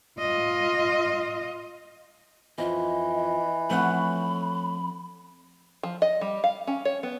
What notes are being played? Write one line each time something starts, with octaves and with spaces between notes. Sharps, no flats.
F4 D#5
F2 E3 D#5
F3 A3 C4 C#5 F#5 B5
F3
D#5
G3
F5
C#4
C#5
B3